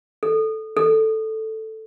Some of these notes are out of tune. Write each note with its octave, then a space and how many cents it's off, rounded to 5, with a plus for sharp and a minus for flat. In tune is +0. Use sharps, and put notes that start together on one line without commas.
A4 -5
A4 +0